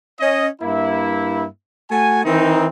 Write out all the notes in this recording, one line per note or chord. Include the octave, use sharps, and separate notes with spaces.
C#4 D#5
G2 A#3 E4
A3 F#4 G#5
D#3 E3 C4 D#4